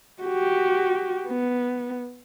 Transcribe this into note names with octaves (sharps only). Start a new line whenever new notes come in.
F#4 G4
B3